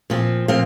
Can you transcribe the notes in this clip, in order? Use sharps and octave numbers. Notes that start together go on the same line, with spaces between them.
A#2 F3 C4
A#2 F3 C4 F5